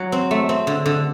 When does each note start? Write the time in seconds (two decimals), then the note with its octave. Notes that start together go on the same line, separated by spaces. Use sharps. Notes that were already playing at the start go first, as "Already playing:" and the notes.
Already playing: F#3
0.12 C4
0.31 A3
0.49 C4
0.67 D3
0.86 D3